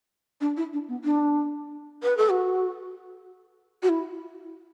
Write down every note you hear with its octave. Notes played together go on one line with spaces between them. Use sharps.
D4
E4
D4
B3
D4
B4
A4
F#4
F#4
E4